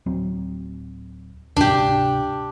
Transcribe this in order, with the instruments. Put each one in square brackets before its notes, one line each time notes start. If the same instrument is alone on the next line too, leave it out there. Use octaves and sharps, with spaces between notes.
[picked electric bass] D1 F#3 C4
[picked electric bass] D2 G#2 C3 [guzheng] D4 G4